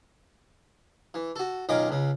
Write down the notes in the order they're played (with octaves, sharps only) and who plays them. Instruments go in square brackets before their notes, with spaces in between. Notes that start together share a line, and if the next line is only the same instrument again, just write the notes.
[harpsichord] E3
F#4 A4
B1 D#3 C#4 F4 D#5 D6
C#2 C#3